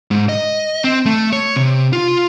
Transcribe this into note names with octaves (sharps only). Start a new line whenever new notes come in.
G#2
D#5
C4
A3
C#5
C3
F4